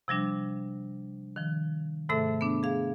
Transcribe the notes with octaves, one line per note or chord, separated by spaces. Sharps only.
C3 F3 G3 D4
D#3 F3
G#2 C3 A3 A4 E5
B3 D4
G#4 F5